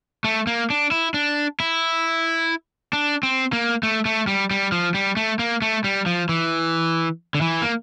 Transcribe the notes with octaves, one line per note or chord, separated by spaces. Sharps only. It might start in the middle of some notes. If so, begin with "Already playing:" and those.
A3
A#3
D4
E4
D4
E4
D4
C4
A#3
A3
A3
G3
G3
F3
G3
A3
A#3
A3
G3
F3
E3
D3
E3
A#3